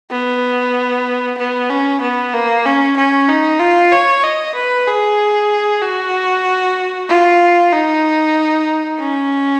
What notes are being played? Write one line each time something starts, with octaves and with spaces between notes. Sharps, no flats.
B3
B3
C#4
B3
A#3
C#4
C#4
D#4
F4
C#5
D#5
B4
G#4
F#4
F4
D#4
C#4